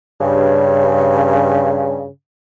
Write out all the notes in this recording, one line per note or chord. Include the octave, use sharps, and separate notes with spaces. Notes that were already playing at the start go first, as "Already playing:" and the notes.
G2 C#3